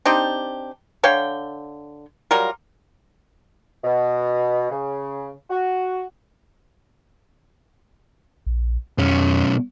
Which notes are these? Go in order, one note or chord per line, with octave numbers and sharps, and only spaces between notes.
C4 D4 D#4 G4
D3 C#5 F5 G5
F#3 G3 F4 A#4
B2
C#3
F#4
A#1
B1 F2 C#4